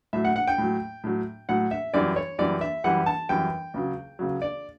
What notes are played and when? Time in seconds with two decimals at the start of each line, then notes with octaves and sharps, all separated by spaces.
0.13 A2 F#3 E5
0.25 F#5
0.36 F#5
0.48 G5
0.58 A2 F#3
1.04 A2 F#3
1.49 A2 F#3 F#5
1.71 E5
1.94 F#2 E3 G3 D5
2.16 C#5
2.39 F#2 E3 G3 D5
2.61 E5
2.84 F#2 E3 G3 F#5
3.06 A5
3.29 F#2 E3 G3 G5
3.74 C#2 C#3 F#3
4.19 C#2 C#3 F#3
4.42 D5